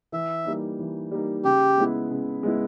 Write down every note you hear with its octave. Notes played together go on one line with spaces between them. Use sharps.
E3 E5
G3 A#3 D#4
E3
G3 A#3 D#4
C#3 G4
G#3 B3 E4
C#3
G#3 B3 E4